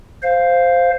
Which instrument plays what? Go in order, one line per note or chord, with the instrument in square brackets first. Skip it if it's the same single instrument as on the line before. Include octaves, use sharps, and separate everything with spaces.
[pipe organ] C5 F5